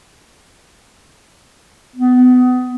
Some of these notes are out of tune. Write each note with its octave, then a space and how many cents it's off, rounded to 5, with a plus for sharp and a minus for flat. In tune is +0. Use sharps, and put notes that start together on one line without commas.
B3 +25